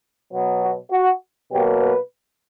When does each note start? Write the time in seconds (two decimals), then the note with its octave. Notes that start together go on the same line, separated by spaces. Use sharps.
0.33 B2 F#3 B3
0.62 F#4
0.91 F#4
1.51 B2 F#3 A#3 G4
1.81 B4